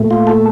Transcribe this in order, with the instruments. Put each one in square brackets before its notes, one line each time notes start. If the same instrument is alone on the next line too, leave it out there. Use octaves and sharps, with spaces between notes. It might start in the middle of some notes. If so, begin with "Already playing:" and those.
Already playing: [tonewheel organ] A#2 A3
F4
A4